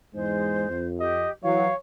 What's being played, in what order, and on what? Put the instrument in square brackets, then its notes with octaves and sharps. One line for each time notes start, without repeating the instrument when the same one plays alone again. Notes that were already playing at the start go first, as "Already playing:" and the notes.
[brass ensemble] E2 G#2 G#3 [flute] C5
[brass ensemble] F2
[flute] G4 [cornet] D#5
[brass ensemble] E3 F#3 [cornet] C#5 [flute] F5